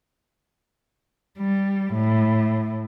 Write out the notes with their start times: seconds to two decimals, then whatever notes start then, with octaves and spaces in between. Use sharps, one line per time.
1.37 G3
1.94 A2